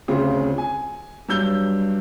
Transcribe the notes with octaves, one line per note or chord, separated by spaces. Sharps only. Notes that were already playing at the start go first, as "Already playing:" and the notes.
D2 C#3 C4 F4
G#5
G2 F#3 E6 G6 G7